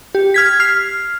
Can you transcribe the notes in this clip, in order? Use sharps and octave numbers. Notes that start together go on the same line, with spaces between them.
G4
F6 G#6 B6
F6 C7